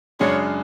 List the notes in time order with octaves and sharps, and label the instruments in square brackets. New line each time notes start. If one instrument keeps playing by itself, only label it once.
[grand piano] F#2 C#3 G#3 D4 G#4 [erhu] C#5